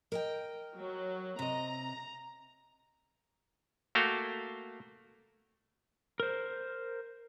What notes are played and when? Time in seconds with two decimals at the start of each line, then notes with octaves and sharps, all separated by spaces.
0.12 A#4 D#5 G5
0.75 F#3
1.39 C3 D#5 A#5
3.95 A3 A#3 F#4 F5 G5
6.20 A#4 C5